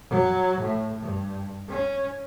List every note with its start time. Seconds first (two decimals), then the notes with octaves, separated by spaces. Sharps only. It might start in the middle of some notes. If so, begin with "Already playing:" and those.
0.10 F#3
0.61 A2
1.02 G2
1.69 C#4